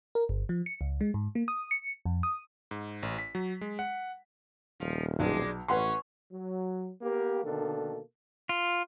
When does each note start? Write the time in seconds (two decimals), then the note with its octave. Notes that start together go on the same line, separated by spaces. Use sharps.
0.15 A#4
0.29 G1
0.49 F3
0.66 C#7
0.81 C#2
1.01 G#3
1.14 G#2
1.35 A#3
1.48 D#6
1.71 C#7
2.05 F2
2.23 D#6
2.71 G#2
3.03 A1
3.19 B6
3.35 F#3
3.61 G#3
3.79 F#5
4.80 D#1 F3
5.19 B1 G#3 D4
5.68 A1 C#4 B4 F#5 C6
6.31 F#3
7.01 A#3 B3 G4
7.44 B2 D3 D#3 A#3 D4 A4
8.49 F4